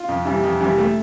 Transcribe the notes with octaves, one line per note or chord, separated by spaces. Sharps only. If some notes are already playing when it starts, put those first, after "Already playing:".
Already playing: F4
F2
C3 E3 G3
F2
C3 E3 G3
A3